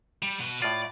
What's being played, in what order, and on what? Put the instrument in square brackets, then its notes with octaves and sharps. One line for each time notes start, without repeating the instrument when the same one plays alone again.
[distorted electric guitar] G3
B2 B4
[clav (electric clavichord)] A2 F4 [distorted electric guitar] D5